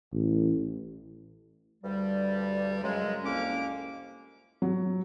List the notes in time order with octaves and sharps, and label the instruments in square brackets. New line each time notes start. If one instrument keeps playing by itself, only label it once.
[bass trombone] A1
[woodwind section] D2 G2 G3
F#2 C#3 F#3 G#3
C2 F2 A#3 C#4 D6
[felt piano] F#3